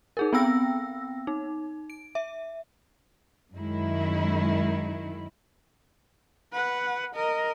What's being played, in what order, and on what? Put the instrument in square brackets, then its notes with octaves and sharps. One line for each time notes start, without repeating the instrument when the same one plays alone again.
[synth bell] D#4 G#4 A#4
B3 C4 G5 E6 A#6
D#4
D7
E5
[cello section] F#2 D#3 G#3 E4
[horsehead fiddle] B4 F#5
A#4 D#5